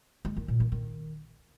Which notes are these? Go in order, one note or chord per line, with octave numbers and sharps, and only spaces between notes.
G#3
D#3
A#2
D#3
D#3